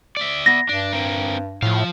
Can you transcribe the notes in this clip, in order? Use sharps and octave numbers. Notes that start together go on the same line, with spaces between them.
D5 E5
B3 A#6
G2 D4
C4 A#4
A2 F3 F5